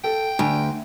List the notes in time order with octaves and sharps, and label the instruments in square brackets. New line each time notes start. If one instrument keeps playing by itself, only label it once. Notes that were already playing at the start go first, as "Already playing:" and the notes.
[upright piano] A4 [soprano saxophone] G5
[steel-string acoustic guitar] D2 [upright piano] G#5